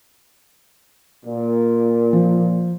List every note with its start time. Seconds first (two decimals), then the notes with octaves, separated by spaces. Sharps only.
1.26 A#2
2.13 F3